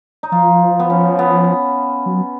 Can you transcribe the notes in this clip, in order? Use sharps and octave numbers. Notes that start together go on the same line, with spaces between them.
D#4
F3 F4
B3
C#4
B3
F#3